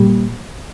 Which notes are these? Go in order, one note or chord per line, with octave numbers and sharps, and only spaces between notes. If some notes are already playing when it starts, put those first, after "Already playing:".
Already playing: A#2 G3